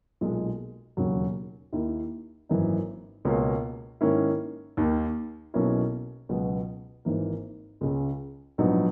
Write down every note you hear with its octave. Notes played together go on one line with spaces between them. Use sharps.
B1 A#2 G#3
E1 D#2 C#3 F#3 C#4
D#2 D#3 A#3 E4
G#1 F#2 E3 A#3 D#4
C#2 B2 A#3 C#4
G#2 D#3 A#3 C#4 E4
D#2 D#3 A#3
B1 B2 A#3 C#4 E4
C#2 B2 F#3 B3
G#1 G#2 E3 A#3
C#2 C#3 G#3
A#1 G#2 F#3 B3 D#4